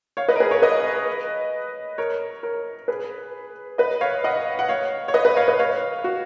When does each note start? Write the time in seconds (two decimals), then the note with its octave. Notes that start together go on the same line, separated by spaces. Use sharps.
0.17 C#5 F5
0.29 B4 D#5
0.35 A#4
0.40 G#4 B4
0.51 A#4 C#5
0.62 B4 D#5
1.98 A#4 C#5
2.43 A#4 C#5
2.88 G#4 B4
3.78 B4 D#5
4.01 C#5 F5
4.24 D#5 F#5
4.59 F#5
4.68 C#5 F5
5.08 C#5
5.14 B4 D#5
5.25 B4 D#5
5.36 C#5 F5
5.48 B4 D#5
5.59 C#5 F5
6.04 F#4